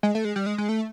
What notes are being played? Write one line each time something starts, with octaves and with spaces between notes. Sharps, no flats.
G#3
A3
G#3
G3
G#3
G#3
A3